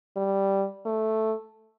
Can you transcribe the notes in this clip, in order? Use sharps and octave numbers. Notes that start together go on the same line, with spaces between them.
G3
A3